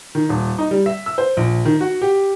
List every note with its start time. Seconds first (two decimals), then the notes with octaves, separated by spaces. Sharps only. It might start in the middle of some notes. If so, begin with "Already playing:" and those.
0.15 D#3
0.29 D#1
0.58 D#4
0.71 G3
0.86 E5
1.06 E6
1.18 C5
1.37 A#1
1.65 D#3
1.81 F#4
2.02 G4